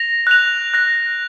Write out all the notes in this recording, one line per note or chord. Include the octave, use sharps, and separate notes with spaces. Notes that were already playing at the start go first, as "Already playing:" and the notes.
Already playing: A#6 F7
F#6 A#6 F7
F#6 A#6 F7